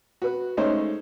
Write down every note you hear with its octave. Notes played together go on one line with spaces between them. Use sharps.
F#4 B4
G#3 A3 C#4 D#4 C5 C#5